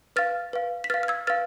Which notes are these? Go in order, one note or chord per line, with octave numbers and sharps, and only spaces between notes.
B4 F5 F6 A6
B4 F5
B6
B4 F5 F6 A6
F6
E6 G#6
B4 F5 F6 A6